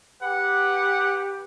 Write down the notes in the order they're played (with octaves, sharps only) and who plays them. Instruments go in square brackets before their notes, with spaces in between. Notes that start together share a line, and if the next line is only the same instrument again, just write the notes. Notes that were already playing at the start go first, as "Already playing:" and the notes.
[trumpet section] G4 B4 [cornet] F#5